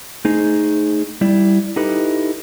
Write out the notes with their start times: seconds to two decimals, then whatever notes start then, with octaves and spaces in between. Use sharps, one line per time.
0.25 A3 D#4 G#4 C5
1.21 G3 E4 D5
1.76 D#4 E4 G4 A4 B4